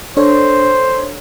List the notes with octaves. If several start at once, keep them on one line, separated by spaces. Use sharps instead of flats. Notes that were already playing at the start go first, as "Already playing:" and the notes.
D4 A4 C5 C#5